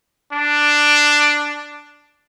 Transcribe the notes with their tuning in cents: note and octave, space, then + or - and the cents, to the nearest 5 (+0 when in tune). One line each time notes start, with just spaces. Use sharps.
D4 +5